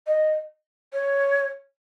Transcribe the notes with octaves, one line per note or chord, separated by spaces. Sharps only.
D#5
C#5